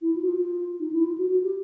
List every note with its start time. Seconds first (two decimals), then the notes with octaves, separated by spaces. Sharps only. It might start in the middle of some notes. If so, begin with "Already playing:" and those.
0.01 E4
0.15 F4
0.22 F#4
0.28 F4
0.79 D#4
0.92 E4
1.04 F4
1.18 F#4
1.30 F#4
1.43 G4